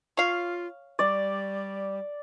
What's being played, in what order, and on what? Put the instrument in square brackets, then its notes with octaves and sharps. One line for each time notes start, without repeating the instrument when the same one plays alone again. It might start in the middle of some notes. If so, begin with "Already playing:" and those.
[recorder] F4 [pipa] C#5 F5
[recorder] G3 [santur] D5